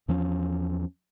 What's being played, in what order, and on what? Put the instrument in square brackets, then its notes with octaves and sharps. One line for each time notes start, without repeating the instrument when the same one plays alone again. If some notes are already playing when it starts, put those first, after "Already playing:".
[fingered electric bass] E2 F3 C#4